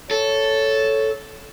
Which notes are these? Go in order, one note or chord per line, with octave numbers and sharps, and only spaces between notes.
A4 C#5